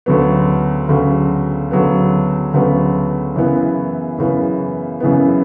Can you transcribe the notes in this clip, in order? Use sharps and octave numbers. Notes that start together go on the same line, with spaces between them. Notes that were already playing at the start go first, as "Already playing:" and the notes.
D2 C#3 F#3 B3
D2 C#3 F#3 B3
D2 C#3 F#3 B3
D2 C#3 F#3 B3
F#2 C#3 E3 B3
F#2 C#3 E3 B3
F#2 C#3 E3 B3